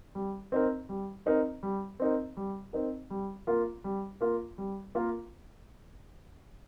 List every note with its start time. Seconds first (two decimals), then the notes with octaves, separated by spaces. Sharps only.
0.15 G3
0.52 C4 D#4 A#4
0.89 G3
1.26 C4 D#4 A#4
1.63 G3
2.00 C4 D#4 A#4
2.37 G3
2.73 C4 D#4 A#4
3.10 G3
3.47 A#3 F4 A#4
3.84 G3
4.21 A#3 F4 A#4
4.58 G3
4.95 A#3 F4 A#4